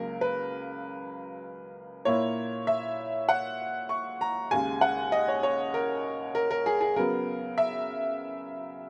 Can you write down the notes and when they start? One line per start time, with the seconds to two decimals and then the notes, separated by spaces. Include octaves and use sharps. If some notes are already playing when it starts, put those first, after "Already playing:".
Already playing: C#2 C#3 F#3 A#3 A#4
0.21 B4
2.05 A#2 A#3 E4 C#5
2.67 E5
3.29 F#5
3.89 C#6
4.21 A#5
4.51 D#2 C#3 G#3 G#5
4.81 F#5
5.12 D#5
5.28 C#5
5.43 C#5
5.74 A#4
6.35 A#4
6.51 A#4
6.66 G#4
6.81 G#4
6.96 C#3 F#3 B3 A#4
7.58 E5